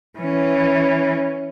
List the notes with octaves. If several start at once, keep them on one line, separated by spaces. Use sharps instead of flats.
E3 C#4